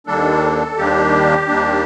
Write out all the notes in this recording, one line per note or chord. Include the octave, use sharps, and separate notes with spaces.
D#2 D#3 G3 A#3 D4 A4
D#2 D#3 G3 A#3 D4 G4
D#2 D#3 G3 A#3 D4